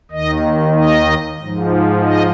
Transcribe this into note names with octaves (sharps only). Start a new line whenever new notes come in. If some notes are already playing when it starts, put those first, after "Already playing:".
D#2 D#3 D#5
D#5
G#2 F3
D#5